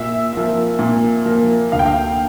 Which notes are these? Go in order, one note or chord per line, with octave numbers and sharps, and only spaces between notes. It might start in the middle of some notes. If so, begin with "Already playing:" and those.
Already playing: A#2 E5
F3 A#3
A#2
F3 A#3
D2 F5
G5
F5